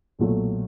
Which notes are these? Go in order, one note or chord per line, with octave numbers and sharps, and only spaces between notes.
B1 A#2 F#3 A3